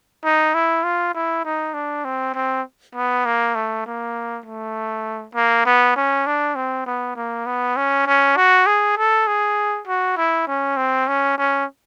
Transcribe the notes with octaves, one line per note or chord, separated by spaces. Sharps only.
D#4
E4
F4
E4
D#4
D4
C4
C4
B3
A#3
A3
A#3
A3
A#3
B3
C#4
D4
C4
B3
A#3
B3
C#4
C#4
F#4
G#4
A4
G#4
F#4
E4
C#4
C4
C#4
C#4